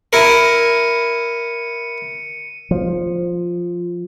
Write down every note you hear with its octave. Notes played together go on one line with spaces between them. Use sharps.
E4 A#4 C#7 D#7
F3